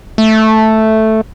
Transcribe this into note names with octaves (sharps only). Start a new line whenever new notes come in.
A3